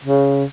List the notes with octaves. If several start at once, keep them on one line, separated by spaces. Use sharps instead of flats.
C#3